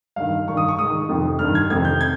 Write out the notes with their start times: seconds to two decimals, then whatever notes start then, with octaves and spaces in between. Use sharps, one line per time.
0.16 G2 D#3 F5
0.47 G2 D#3 C#6
0.57 D#6
0.68 C#6
0.79 G#2 D#3 D#6
1.09 F2 C3 D#3
1.39 G2 D#3 F6
1.55 G#6
1.70 F2 C3 D#3 G#6
1.85 G6
2.01 G#6